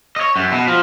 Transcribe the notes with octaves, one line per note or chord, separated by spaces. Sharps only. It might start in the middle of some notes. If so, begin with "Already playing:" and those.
C#5 D#5
F#2
B2
F3